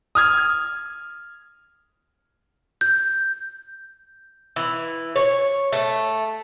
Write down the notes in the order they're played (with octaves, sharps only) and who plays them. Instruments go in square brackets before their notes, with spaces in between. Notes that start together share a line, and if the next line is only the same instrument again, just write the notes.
[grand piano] D#6 F6 G#6
[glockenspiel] G6
[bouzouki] E3
C#5
A3